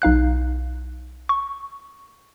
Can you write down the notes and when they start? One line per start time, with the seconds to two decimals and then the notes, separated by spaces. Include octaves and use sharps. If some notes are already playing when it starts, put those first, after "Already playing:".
0.02 B1 D#4 F5 F#6
1.29 C#6